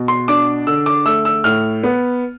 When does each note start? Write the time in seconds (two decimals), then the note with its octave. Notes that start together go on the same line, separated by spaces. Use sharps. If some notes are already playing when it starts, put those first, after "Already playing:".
Already playing: B2
0.08 C6
0.28 D4 D6
0.67 D3 E6
0.86 D6
1.05 A3 E6
1.25 E6
1.44 A2 F6
1.84 B3